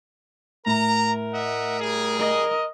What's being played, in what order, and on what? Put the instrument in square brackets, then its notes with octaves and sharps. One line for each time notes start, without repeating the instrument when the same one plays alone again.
[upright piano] A2 [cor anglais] A#4 [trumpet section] A#5
[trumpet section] D#5 E5 F#5
G3 G#4
[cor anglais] A#4 [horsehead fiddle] D#5